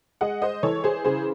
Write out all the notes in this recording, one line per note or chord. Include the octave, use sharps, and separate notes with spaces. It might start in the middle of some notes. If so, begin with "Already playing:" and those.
G#3 D#5 F#5
C5 D#5
E3 A4 C#5
G#4 C5
C#3 G#4 C5